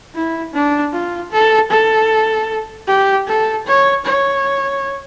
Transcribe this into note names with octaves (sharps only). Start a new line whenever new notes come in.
E4
D4
F4
A4
A4
G4
A4
C#5
C#5